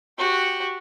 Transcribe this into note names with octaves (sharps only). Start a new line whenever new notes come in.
F#4 G4